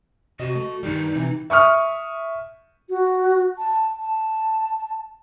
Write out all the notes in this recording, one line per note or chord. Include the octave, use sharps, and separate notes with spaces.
C3 F#4 D#5
A3
G2 D#3 G3 D#4
C3 E3
E5 C#6 D#6 F6
F#4
A5
A5